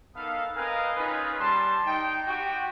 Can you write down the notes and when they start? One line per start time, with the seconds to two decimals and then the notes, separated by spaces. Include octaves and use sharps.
0.15 B3 D#4 A4 A#4 F5
0.55 C4 A#4 B4 D#5 F5 G#5
0.96 C#4 D#4 F4 G#4 B4
1.39 G3 A5 C6
1.85 D#4 G5
2.27 F#4 G4 G5